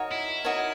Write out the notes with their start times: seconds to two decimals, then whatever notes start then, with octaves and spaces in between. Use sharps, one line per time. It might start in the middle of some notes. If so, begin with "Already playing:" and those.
Already playing: D#4 F#4 A#4 C#5
0.12 E4
0.45 D#4 F#4 A#4 C#5